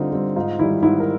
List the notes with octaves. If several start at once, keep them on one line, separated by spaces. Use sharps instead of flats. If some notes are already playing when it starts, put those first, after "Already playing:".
Already playing: D3 G3 C4 D#4 F4
G3 C4
G#2 D#4 F4
D#3 G3 E4
G#2 E4
A#4